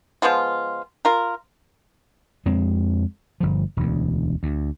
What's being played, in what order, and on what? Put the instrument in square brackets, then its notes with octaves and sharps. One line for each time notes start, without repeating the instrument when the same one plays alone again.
[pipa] F3 G#3 B3 F4
F4 A#4
[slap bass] F2 G#3 C4
G1 F3
E1 D2
D2